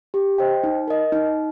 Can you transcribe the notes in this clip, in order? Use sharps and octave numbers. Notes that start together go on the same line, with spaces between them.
G4
C5 D#5 G5
D#4
A#4 D#5
D#4